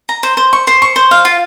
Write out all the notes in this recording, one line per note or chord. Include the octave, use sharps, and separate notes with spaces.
A#5
C5
C5
C#6
C5
C#6
C5
F5
F4